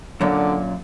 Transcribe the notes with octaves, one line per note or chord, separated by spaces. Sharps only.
F#2 A#2 D3